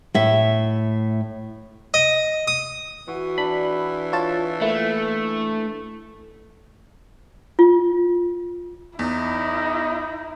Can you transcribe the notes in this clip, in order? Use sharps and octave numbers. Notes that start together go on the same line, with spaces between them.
A2 E5
D#5
D#6
E3 F#4
D4 B5
F4 C#5 A5
A3 A#3 E4
F4
E2 D#4 E4